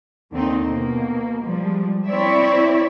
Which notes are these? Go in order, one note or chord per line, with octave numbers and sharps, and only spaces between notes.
D#2 D3 C4 D#4
B2 A#3
F3 G3 G#3
C4 E4 C#5 D5 E5